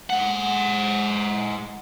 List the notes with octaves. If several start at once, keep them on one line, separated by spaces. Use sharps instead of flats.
G#3 F#5